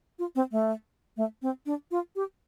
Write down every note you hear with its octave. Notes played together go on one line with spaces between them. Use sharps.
F4
C4
A3
A3
C4
D4
F4
G4